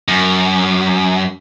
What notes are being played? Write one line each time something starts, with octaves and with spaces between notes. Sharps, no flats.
F#2